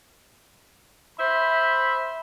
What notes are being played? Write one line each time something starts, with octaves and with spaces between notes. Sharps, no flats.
C5 E5 B5